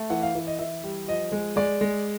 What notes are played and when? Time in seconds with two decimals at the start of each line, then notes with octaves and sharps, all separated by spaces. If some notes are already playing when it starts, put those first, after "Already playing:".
Already playing: A3
0.10 E3 F#5
0.23 F5
0.35 E3
0.47 D#5
0.59 E3 E5
0.84 G3
1.08 F3 D#5
1.32 G#3
1.56 G#3 D5
1.81 G#3